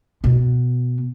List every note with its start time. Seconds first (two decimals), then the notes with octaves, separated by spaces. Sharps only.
0.24 B2 B3